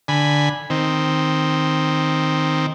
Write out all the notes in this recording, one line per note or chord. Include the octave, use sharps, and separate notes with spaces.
D3 G#5 B5
D#3 C4